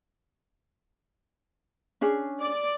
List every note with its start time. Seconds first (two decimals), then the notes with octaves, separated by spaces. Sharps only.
2.01 C#4 D4 G#4
2.41 D5